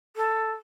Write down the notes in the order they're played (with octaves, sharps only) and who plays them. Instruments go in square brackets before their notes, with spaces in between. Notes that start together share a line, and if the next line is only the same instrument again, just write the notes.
[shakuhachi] A4